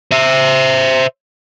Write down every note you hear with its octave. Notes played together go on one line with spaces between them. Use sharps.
C5 E5